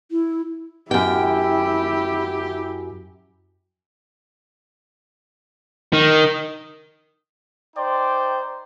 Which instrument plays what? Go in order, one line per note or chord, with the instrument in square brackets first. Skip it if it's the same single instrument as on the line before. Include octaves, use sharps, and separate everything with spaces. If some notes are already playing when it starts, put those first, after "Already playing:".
[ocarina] E4
[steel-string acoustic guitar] F#2 G5 [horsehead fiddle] E4 [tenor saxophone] G4
[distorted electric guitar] D#3
[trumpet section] D#4 C5 D5 G5